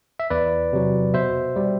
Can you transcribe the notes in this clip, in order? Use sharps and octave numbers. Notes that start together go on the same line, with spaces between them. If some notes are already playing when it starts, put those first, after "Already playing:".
E5
E2 B4 D5
C3 F#3
B2 C5 E5
G3